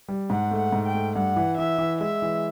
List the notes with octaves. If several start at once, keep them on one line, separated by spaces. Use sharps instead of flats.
G3
G#2 F#5
A3
F#5
G#2
G5
A3
G2 F#5
E3
E3 E5
E3
G#3 E5
E3